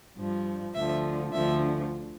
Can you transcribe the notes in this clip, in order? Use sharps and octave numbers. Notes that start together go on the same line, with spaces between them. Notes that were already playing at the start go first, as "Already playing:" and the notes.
G2 F3
D2 D3 F3 E5
D2 D3 F3 E5